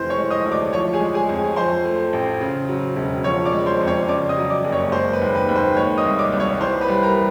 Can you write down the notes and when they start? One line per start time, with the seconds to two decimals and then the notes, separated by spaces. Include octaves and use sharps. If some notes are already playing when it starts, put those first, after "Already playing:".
Already playing: F1 E3 C5 C6
0.10 C#5 C#6
0.17 G#3
0.31 D#5 D#6
0.45 D2
0.52 D5 D6
0.73 F3 C#5 C#6
0.93 G#4 G#5
1.00 G#3
1.14 G#4 G#5
1.29 F2
1.56 F3 C5 C6
1.85 A3
2.13 A1
2.41 C#3
2.69 F#3
2.96 E1
3.24 F3 C#5 C#6
3.45 D5 D6
3.53 G#3
3.66 C5 C6
3.80 F2
3.87 C#5 C#6
4.08 C#3 D5 D6
4.29 D#5 D#6
4.37 F#3
4.50 D5 D6
4.64 F#1
4.72 C#5 C#6
4.92 G#3 C5 C6
5.13 B4 B5
5.21 D#2
5.35 B4 B5
5.49 D#2
5.56 C5 C6
5.77 G#3 C#5 C#6
5.98 D#5 D#6
6.05 C2
6.18 D5 D6
6.32 C2
6.40 C#5 C#6
6.61 E3 C5 C6
6.81 B4 B5
6.88 G3
7.03 A#4 A#5